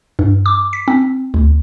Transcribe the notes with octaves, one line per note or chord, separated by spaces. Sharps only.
G2
D6
B6
C4
D2